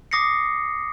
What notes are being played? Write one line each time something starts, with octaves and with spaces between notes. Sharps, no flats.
D6 D#6 A#6 C7 C#7